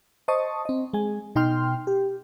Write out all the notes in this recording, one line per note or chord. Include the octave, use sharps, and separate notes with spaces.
C5 D#5 A5 C#6 D#6
C4 D#5
G#3 G#5
B2 D#4 G5 C6 F6
G4